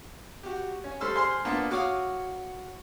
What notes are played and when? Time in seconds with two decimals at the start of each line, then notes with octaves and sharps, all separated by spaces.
0.43 F#4 G4
0.84 C#4
1.01 G3 A4 C5 E6 F6
1.15 G#4 C5 C6 F6
1.45 A#3 B3 D4 F4 A5
1.71 F#4 C#5 F5 D6 D#6